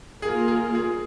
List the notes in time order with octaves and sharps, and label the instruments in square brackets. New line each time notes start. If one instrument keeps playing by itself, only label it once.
[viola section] A#3 F4 A#4 [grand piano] G#4
[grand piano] G#4
G#4